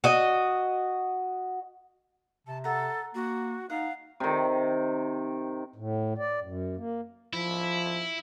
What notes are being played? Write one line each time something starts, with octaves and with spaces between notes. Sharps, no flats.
F#4 D#5
C3 A5
A4 F#5 A#5
A#3 F#4
D#4 F5 F#5
C3 D#3
A2
D5
F#2
A#3
F3 E4